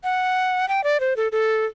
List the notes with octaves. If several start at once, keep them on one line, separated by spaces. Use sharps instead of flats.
F#5
G5
D5
C5
A4
A4